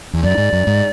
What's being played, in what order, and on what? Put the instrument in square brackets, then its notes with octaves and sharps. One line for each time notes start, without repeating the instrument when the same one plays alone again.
[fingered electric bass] E2
[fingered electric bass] F#2 [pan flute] D5
[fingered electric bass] G#2
F#2
G#2